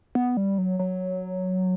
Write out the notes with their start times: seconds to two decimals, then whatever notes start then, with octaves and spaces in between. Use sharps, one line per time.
0.15 B3
0.37 G3
0.58 F#3
0.79 F#3